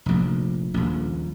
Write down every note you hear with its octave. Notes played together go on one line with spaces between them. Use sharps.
F1 A#1
D#1 A#1